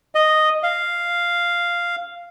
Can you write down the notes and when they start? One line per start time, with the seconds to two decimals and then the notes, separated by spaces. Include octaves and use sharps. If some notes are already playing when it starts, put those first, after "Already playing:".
0.15 D#5
0.63 F5